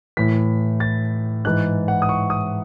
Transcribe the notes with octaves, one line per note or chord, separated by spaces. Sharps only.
A2 E3 B6
A6
G#2 E3 F#6
F#5
D#6
C#6
D#6